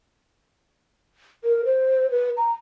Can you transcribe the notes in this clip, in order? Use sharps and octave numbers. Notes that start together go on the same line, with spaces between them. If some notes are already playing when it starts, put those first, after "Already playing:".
A#4
C5
B4
A#5